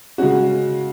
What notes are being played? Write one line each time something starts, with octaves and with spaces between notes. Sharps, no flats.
C#3 G#3 C#4 F#4